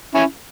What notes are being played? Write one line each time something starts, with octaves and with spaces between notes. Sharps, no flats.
C#4 E4